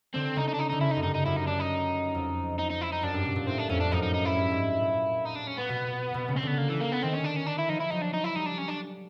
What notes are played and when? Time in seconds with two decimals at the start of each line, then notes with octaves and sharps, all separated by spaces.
0.14 D3 C4
0.36 C#3 D#4
0.48 D#4
0.54 D4
0.59 D#4
0.69 D3 D#4
0.81 C#3 E4
0.91 D#4
0.96 F#2
1.03 G2 D#4
1.15 D#4
1.25 F#2 E4
1.36 D#4
1.47 D4
1.59 D#4
2.14 F2
2.59 D#4
2.70 D#4
2.81 E4
2.92 D#4
3.03 F#2 D4
3.14 G2
3.25 B2
3.36 A#2
3.47 A2 C4
3.59 D4
3.69 F2 C#4
3.80 D4
3.92 F#2 D#4
4.03 D#4
4.14 D#4
4.25 E4
4.36 G2
4.51 G#2
4.80 A#2
5.26 D#4
5.36 D4
5.48 C#4
5.59 B3
5.69 B2
6.14 B2
6.28 C#3
6.36 C4
6.43 D3 B3
6.58 A#3
6.70 E3
6.80 A#3
6.92 B3
7.02 D#3 C4
7.13 C#4
7.24 D4
7.36 C#4
7.47 D4
7.59 E4
7.69 F3 D#4
7.80 E4
7.91 F#3 D#4
8.02 D4
8.13 D#4
8.24 E4
8.36 G3 D#4
8.46 D4
8.58 C#4
8.69 D4